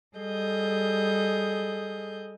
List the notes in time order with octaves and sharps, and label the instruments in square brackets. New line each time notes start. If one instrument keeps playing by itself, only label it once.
[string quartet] G3 G#4 A4 D#5 G6